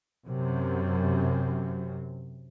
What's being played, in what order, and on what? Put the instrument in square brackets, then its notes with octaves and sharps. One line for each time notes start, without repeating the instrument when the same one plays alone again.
[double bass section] F#2 C3